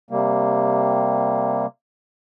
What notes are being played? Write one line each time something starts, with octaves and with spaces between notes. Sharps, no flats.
C3 G3 A#3